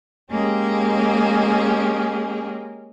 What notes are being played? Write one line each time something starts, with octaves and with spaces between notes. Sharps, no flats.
G#3 A#3 C#4 G4 G#4